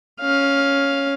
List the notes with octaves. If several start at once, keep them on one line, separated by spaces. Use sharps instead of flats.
C#4 F5